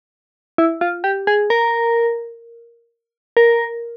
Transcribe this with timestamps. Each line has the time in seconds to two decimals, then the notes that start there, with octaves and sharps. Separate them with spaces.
0.58 E4
0.81 F4
1.04 G4
1.27 G#4
1.50 A#4
3.37 A#4